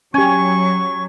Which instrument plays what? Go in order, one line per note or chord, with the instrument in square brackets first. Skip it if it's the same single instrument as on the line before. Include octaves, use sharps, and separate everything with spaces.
[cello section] F#3 [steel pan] C#4 G4 [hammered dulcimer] C#5 G#5 [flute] C#6